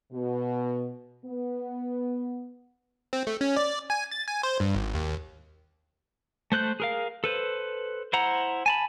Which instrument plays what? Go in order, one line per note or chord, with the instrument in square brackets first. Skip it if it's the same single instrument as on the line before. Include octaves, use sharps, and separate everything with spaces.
[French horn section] B2
B3
[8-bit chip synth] C4
A3
C#4
D5
G#5
A6
G#5
C5
G2
G#1
D#2
[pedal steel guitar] A3 C5 F#6 G6
G#4 A#4 F5
A4 B4 C5
E4 C5 F#5 A#5
G#5 A5 B5